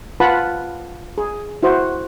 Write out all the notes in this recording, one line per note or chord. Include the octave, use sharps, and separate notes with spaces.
F4 B4 F#5 A5 B5
G#4
E4 F#4 C5